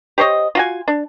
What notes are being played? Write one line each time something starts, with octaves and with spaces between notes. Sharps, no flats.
G4 C5 C#5 D#5
F4 F#4 G#5
D4